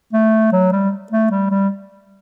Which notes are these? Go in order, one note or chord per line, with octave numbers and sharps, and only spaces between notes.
A3
F#3
G3
A3
G3
G3